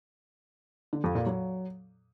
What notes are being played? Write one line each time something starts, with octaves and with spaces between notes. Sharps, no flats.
D3
F2
A#2
F#3